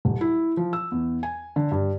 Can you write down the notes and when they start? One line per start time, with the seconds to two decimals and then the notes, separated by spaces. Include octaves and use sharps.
0.05 D#1
0.21 E4
0.57 F3
0.73 E6
0.92 E2
1.23 G#5
1.56 D3
1.71 G2